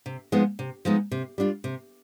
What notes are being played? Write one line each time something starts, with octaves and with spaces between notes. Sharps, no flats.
C3
F3 G#3 B3 D#4
C3
F3 G#3 B3 D#4
C3
G3 D4 F4
C3